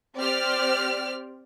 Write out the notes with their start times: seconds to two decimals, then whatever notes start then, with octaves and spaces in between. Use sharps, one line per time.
0.17 C4 G4 C5 D5 F6